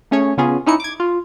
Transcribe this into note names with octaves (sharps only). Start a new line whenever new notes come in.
A3 C#4 G#4 C#5
C#3 B3 C#4 F4 G#4
C#4 D#4 E4 C#7
D6 G#6
F4